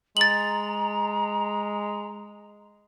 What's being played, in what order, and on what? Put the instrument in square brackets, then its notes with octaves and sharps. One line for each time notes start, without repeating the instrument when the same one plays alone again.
[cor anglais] G#3 [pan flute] A#5 [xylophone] A6 F#7